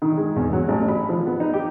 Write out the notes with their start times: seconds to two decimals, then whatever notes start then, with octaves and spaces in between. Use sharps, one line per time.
0.02 D#3
0.17 G#3
0.36 E2
0.53 F#3
0.68 A1
0.88 B5
1.09 F3
1.26 B3
1.40 D#4
1.54 G4